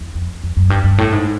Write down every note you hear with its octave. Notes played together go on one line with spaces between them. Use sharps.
E2
F2
F2
F#2
G2
G2
A2
G#2